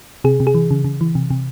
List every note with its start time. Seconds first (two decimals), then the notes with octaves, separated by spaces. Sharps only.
0.24 C3 G#4
0.40 C3
0.47 G#4
0.55 E3
0.71 C#3
0.85 C#3
1.01 E3
1.15 C3
1.31 C3